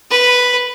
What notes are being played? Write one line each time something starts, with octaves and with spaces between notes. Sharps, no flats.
B4